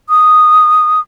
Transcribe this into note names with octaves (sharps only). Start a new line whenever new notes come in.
D#6